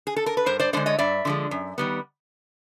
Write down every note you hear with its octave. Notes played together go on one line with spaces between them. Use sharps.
G#4
A4
A#4
B4
G2 A#4 C5
C5 D5
D3 F3 G#3 C5 D5
C#5 D#5
G2 D5 E5
D3 F3 G#3
F#2
D#3 G3 B3